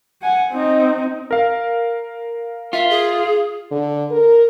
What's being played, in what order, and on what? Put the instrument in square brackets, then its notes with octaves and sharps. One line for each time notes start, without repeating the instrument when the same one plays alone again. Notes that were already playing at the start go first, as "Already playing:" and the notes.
[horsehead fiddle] F#5 G#5
C4 D#4
[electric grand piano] A#4 F5
[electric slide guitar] F4 [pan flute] E5
[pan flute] G#4
[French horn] D3
A#4